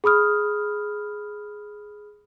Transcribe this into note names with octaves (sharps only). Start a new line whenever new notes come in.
G#4 B5 D#6 F6